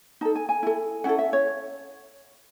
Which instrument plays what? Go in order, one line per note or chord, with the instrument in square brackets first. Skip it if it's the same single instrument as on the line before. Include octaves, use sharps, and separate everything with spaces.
[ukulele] D#4 A4 A5
G#5
G#5
E4 A4
C#4 E4 A4 F#5
E5
C#5